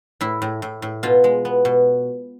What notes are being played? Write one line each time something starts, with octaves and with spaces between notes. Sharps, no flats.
A2 E4
A2
A2
A2
B2 F4
G#3
B3
B2